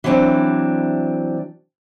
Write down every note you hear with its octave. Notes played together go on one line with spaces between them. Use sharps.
E3 F#3 C4 D4